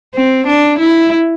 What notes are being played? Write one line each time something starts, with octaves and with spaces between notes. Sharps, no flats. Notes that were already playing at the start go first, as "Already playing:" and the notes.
C4
D4
E4